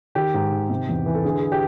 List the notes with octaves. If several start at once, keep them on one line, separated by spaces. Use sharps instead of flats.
D#3 G4
G#2
D#3
C3
E2
E3
A4
D3 G#4
G#4
G4